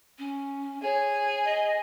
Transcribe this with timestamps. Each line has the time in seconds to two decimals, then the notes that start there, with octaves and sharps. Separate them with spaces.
0.18 C#4
0.83 G#4 C#5
1.44 D#5